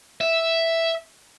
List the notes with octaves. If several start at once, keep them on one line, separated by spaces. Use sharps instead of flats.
E5